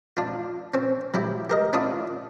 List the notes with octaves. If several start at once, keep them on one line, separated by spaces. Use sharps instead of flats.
D4 F4
C4 C#4
F#3 E4 G4
G4 A#4 D#5
C#4 D4 E4 F4 D#6